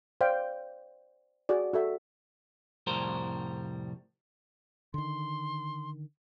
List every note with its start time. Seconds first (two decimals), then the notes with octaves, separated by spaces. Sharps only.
0.21 C5 D5 F5 G5
1.49 F#4 G#4 D5
1.73 F#4 A4 E5
2.87 C2 F2 A2 G3 A#4 C5
4.94 D3 D#3 C6